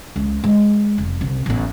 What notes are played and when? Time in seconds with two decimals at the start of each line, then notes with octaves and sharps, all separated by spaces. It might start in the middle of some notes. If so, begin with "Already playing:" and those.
0.16 C#2
0.44 G#3
0.98 F1
1.21 C2
1.46 A1 B3